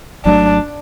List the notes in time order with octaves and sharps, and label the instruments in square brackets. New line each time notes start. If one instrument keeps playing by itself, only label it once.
[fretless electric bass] G#1 G#2 F#3 A3 [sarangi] D4